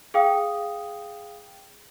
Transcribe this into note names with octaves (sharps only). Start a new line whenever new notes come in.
G#4 F5 G5 D#6